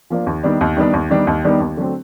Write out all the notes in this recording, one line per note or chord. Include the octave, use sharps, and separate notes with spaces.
F3 A#3 D4
D#2
D#3 G3 B3 D4
D#2
D#3 G3 B3 D4
D#2
D#3 G3 B3 D4
D#2
D#3 G3 B3 D4
D#2
D3 F#3 A3 C4